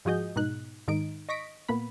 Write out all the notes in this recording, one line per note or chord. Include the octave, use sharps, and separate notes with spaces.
G#2 F3 F#4 G#4 D#5 G6
G#2 B2 D#4 F#6
G#2 D#3 D#4 D7
D#5 C#6 A#6 B6 D7
A#2 A#3 B3 B5